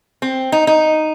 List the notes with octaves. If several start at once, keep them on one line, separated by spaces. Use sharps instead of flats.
C4
D#4
D#4